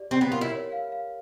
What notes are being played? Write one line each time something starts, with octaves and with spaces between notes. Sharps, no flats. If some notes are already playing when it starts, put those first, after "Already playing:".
Already playing: G4 D5
C4 G4
B3
F4 A#4
E4
C#5
F5
F5